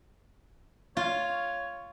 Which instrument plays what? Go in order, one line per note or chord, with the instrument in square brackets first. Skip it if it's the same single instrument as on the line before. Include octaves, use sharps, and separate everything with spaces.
[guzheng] F4 [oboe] C#5